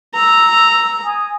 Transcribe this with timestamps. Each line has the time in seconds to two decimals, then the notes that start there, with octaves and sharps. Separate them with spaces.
0.15 A#5 E6
1.04 G#5 D#6